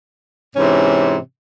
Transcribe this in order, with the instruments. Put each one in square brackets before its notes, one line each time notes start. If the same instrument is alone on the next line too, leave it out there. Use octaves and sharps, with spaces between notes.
[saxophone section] G#2 C3 E3 C#4